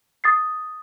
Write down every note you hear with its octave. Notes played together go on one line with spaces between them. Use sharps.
D#6 A6 C7